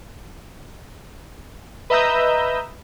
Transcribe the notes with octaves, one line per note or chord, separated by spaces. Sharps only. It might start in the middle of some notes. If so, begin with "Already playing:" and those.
B4 D#5 E5 A#5 E6 G6